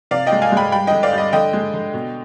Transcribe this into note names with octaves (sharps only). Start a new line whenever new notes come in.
C3 D5 F5
D#5 G5
G#3
F5 G#5
G#3 G5 B5
G3 G5 B5
D3 D#5 G5
D5 F5
G3
D#5
D3 D#5 G5
G#3
D3
B2